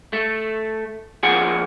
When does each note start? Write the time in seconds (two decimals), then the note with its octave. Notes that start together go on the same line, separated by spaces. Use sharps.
0.13 A3
1.23 A#2 F3 G#4 F#5 G#5